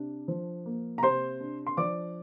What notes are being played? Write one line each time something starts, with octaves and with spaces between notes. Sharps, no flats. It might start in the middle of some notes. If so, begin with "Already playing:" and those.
Already playing: C3 D4
F3
A#3
A#5
C3 C5 C6
D4
C6
F3 D5 D6